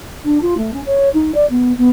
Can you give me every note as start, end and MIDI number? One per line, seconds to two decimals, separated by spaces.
0.24 0.38 62
0.41 0.54 65
0.57 0.73 57
0.73 0.81 61
0.86 1.09 73
1.14 1.31 63
1.34 1.48 74
1.49 1.72 59
1.77 1.89 59